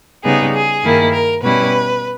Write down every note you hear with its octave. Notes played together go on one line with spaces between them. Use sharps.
C#3 G3 B3 D#4 G#4
G#4
G2 D#3 A#3 E4
A#4
B2 G3 C#4 E4 B4